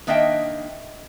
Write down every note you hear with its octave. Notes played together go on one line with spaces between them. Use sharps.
D#3 A#3 D4 D#5 E5 G5